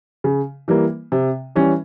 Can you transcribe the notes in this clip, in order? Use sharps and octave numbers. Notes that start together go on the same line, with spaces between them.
C#3
E3 G3 A#3
C3
E3 G3 C#4